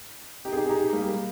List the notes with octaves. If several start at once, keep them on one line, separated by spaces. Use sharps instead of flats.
D#4 G4
G#4
D#4 G4
D#4 G4
G3 A#3